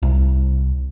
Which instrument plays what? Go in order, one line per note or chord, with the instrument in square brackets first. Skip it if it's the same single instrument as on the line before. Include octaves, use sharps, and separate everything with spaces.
[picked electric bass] C2